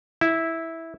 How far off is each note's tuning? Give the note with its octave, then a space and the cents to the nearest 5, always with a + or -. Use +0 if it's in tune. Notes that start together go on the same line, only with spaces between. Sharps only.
E4 -10